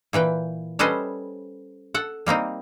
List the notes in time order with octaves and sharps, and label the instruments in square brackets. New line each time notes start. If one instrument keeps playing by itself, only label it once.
[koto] A#2 E3 B4 G5
G3 C#4 A4 B4 C5 D#5
A4 F#5
G3 A#3 C4 D#4